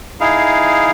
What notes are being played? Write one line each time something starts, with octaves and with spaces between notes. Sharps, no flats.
D#4 E4 G#4 F5